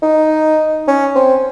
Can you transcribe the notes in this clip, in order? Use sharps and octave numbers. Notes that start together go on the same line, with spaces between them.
D#4
C#4
C4